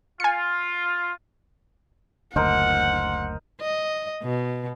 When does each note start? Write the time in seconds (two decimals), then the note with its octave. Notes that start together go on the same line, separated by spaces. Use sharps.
0.20 F4 G#5 C#7
2.36 F#1 D2 A#4 C5 D#5 F#5
3.61 D#5
4.23 B2